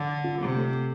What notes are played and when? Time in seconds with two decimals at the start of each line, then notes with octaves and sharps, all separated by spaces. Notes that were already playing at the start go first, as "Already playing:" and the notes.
Already playing: D3
0.24 F4
0.40 C3
0.56 A3